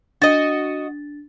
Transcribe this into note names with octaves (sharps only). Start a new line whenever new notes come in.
D4 F#4 D#5 A6